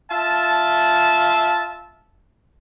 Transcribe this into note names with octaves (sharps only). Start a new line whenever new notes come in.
F4 E5 A5